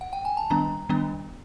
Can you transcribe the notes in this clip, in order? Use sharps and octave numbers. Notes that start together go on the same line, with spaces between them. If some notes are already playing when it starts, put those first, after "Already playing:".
F#5
G5
G#5
A5
D#3 G3 B3 D4 A#5
D#3 G3 B3 D4